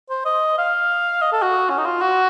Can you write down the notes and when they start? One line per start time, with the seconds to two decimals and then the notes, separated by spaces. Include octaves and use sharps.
0.10 C5
0.25 D#5
0.58 F5
1.22 D#5
1.32 A4
1.42 F#4
1.69 C#4
1.78 D#4
1.85 F4
2.01 F#4